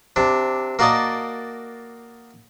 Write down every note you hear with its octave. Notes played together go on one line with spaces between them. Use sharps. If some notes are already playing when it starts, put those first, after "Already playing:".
C3 D4
A#3 F#4 A#4 D5 D#5 A5